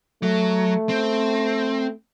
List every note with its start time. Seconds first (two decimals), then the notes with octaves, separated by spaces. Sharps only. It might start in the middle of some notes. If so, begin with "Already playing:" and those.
0.23 F#3 A3
0.89 C4